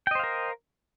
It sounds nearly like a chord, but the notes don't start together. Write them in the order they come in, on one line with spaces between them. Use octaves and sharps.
G5 D#5 C5 F5 A#4